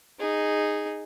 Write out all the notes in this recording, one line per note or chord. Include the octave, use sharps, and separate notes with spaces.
D#4 G#4